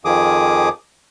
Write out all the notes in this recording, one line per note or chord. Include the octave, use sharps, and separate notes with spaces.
F2 D#3 F3 G#4 D6 D#6